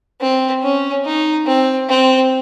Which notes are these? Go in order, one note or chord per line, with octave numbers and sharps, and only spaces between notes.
C4
C#4
D#4
C4
C4